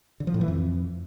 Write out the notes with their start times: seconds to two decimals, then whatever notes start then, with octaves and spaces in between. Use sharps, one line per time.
0.20 D3
0.27 F3
0.34 A2
0.41 E3
0.48 F2